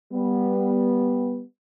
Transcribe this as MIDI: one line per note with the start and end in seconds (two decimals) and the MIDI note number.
0.12 1.43 55
0.12 1.43 59